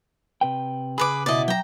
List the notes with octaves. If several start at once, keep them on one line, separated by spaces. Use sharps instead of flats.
C3 B4 G5
C#3 G#4 B4 B5 D6
B2 E4 D5 D#5
F#3 E5 G5 A#5